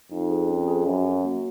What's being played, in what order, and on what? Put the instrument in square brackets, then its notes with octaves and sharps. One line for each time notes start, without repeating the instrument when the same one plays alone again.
[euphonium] F2 [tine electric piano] D#4
[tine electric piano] G#4
C#4
G#4
[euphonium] F#2 [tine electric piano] C#4
[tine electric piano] F#4
A#3